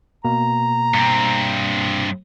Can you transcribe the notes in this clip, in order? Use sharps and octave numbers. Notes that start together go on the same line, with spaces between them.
B2 A#3 A#5
G2 C4